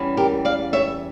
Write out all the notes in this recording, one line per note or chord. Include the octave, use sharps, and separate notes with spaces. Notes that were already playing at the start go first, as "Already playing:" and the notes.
Already playing: E2 E3 G3 C#4
G4 A#4
D5 F5
C#5 E5